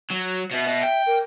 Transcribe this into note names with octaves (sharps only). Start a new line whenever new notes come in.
F#3
B2 B3 E5
B2
G5
A#4